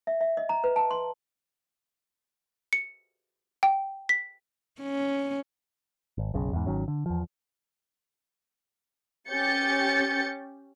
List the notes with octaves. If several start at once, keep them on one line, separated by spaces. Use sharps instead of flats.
E5
E5
D#5
A#5
B4
A5
C6
C#7
G5
B6
C#4
G#1
F#1 B1 C#3
E2 G#2
G#1 D#3 F#3 C#4
D3
E2 F3
C#4 G4 G6 A6 C#7